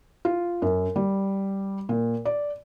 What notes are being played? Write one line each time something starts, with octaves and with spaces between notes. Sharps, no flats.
F4
F#2
G3
A#2
D5